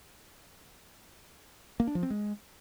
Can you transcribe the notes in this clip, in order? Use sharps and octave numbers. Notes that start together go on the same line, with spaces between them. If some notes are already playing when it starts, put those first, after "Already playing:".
A#3
D4
F3
C4
G#3